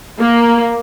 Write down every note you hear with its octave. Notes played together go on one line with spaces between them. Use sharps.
A#3